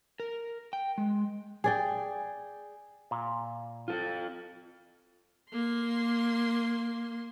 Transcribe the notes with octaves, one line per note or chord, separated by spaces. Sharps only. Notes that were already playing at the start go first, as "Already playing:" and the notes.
A#4
G5
G#3
G#4 D5 G5
A#2
F4 A4
A#3 C6